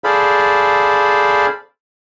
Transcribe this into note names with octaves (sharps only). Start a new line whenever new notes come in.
G#4 A4 C5 D5 F5 B5